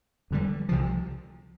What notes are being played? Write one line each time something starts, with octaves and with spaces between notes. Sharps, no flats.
F2 D3 G3
C2 C3 F3